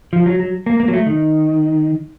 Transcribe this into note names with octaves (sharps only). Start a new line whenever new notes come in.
F3
F#3
F#3
A#3
A#3
F#3
A3
D#3